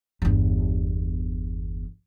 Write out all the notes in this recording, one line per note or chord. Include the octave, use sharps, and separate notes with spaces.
G1 E2